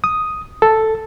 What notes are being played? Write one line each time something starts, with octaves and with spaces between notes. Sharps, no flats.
D#6
A4